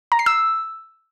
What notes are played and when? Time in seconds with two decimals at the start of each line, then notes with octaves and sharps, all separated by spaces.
0.12 A#5
0.19 C7
0.26 E6